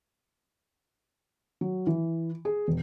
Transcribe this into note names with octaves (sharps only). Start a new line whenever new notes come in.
F#3
E3
G#4
E1